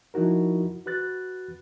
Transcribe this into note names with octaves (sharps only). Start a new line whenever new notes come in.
F3 D#4 E4 F#4 A#4
F#4 B4 F#6 A6